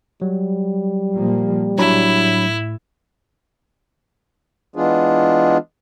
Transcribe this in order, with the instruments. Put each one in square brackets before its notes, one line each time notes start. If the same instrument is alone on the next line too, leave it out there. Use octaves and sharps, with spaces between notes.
[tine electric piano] F#3 [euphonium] G3
[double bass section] A#2 F3 A#3
[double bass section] A2 [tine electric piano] F#3 D4 B5 [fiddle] E4
[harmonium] E3 G#3 B3 D4 F4 G#4